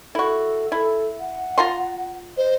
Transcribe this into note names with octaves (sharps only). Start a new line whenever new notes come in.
E4 F#4 A4
E4 A4
F#5
F4 A#5 C6
C5 D#5